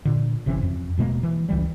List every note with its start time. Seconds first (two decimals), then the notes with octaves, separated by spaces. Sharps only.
0.05 A#2 D3
0.46 G1 C3 E3 C#4
0.63 F2
0.97 D#1 B2 G#3 A#3
1.23 E3
1.49 C#2 E3 G3